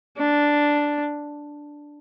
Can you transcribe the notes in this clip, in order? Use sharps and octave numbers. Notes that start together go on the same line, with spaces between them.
D4